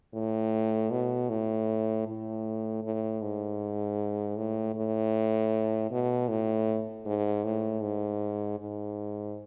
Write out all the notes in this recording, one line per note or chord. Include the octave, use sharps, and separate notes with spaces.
A2
B2
A2
A2
A2
G#2
A2
A2
B2
A2
G#2
A2
G#2
G#2